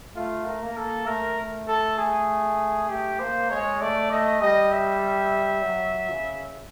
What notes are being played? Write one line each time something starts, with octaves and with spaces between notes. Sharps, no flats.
A3 F4
A#4
A#3
A4
A3 A#4
A4
G#4
A3 G4
A#3 C5
G#3 C#5
A3 D5
A3 D#5
G3 D#5
E5
F#3
C#3